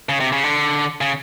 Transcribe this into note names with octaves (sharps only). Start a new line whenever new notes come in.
C#3
C3
C#3
D3
C#3